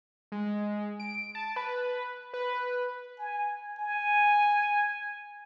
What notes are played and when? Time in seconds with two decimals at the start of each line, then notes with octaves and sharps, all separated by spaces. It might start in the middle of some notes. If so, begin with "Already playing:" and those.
0.32 G#3
1.00 D7
1.35 A5
1.56 B4
2.34 B4
3.18 G#5
3.78 G#5